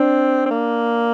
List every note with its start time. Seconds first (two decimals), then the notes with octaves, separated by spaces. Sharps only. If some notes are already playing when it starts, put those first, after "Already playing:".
Already playing: C4 D4
0.46 C4
0.51 A#3